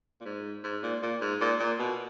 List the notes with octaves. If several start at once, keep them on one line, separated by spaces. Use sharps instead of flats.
A#2
G#2
G#2
A#2
A#2
G#2
A#2
A#2
B2